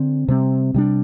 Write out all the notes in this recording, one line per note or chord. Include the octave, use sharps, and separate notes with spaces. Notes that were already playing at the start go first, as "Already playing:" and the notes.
Already playing: D3 C4
C3 G3 C4
C3 G3 D4